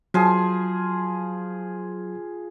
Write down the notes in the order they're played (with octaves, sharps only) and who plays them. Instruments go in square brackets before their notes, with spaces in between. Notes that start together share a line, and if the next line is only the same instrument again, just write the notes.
[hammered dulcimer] F3 G#4 [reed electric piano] F#3